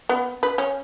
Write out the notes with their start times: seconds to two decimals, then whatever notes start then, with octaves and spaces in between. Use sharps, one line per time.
0.09 B3
0.43 B4
0.58 C#4